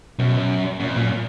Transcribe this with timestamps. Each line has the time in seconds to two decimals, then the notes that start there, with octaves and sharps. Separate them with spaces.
0.19 F#2 B2
0.80 F#2 A#2
0.88 F2
0.96 F#2 A#2